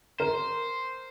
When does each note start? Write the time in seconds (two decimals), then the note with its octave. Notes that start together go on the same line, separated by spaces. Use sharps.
0.20 A#4 C5